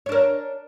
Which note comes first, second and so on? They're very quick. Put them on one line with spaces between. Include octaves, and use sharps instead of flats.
C#5 D4 A#4